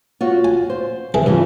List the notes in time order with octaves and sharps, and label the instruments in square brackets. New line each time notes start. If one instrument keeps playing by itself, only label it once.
[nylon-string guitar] F4 F#4 C#5
[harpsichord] G#5
[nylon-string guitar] C5
[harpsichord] E3 D4 G#4
[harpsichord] G2 [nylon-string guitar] C#3 E3 F3